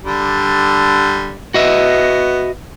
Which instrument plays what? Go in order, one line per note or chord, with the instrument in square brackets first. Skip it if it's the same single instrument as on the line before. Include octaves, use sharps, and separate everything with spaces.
[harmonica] D3 G3
[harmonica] B3 [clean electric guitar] F#4 D#5 E5